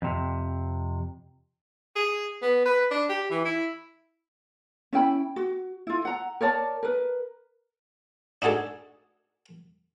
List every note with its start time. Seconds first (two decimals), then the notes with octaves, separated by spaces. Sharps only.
0.02 F2 C3
1.96 G#4
2.42 B3
2.66 B4
2.91 D4
3.09 G4
3.30 E3
3.45 E4
4.93 C#4 E4 G5 B5
5.36 F#4
5.87 E4 F4
6.05 F#5 A#5
6.41 A#4 C#5 D5 A5
6.83 A#4 B4
8.42 D4 D#4 F#4 G#4 A4